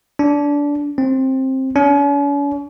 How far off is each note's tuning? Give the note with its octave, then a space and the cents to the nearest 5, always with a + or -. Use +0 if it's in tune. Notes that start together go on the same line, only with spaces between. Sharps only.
D4 -20
C4 +15
C#4 +45